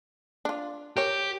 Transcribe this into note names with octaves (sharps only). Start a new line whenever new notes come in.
D4 F4
G4 A#4 C#5